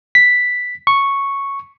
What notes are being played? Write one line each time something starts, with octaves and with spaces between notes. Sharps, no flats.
B6
C#6